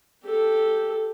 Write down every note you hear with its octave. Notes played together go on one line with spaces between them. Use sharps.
G4 A4